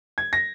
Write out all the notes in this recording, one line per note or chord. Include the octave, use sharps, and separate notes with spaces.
G#6
A#6